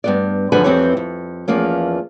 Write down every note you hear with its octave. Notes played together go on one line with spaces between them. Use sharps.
G2 B3 D5
F#2 D3 F3 B4 F#5 G#5
F2 E3 C4 G4 B4 C#5
F2
E2 F3 A#3 C#4